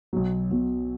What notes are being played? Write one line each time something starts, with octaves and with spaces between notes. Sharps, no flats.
B1 B2 F#3
B1 B2 F#3